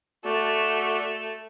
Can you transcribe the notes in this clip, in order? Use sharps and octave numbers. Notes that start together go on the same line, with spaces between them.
A3 F#4 D5